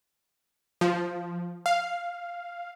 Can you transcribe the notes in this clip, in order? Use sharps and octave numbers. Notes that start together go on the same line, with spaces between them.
F3
F5